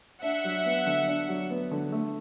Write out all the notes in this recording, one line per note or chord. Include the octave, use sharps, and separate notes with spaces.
D4 E5 F#5
F#3
B3
D3
D4
F#3
B3
D3
A3